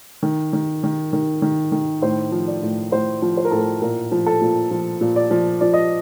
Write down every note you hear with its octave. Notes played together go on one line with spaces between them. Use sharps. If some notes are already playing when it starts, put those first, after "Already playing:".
D#3
D#3
D#3
D#3
D#3
D#3
A2 C5
F3
D5
A2
A2 C5
F3
C5
A#4
A2 A4
A#4
A#2 A#4
F3
A4
A#2
F3
A#2
D5
F3
F3 D5
D#5